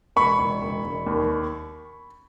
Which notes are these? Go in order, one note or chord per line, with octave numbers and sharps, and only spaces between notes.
E1 B5 C#6
E1
E1
E1
D#2